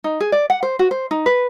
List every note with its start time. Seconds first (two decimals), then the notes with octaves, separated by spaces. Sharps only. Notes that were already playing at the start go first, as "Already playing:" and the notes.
0.04 D#4
0.20 G#4
0.32 D5
0.50 F#5
0.63 C5
0.79 F#4
0.91 C5
1.11 D#4
1.26 B4